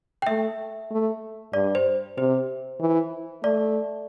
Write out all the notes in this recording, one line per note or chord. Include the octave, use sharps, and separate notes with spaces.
G5
A3 E5
A3
G2 D5
C5
C3 C5
E3
A3 D5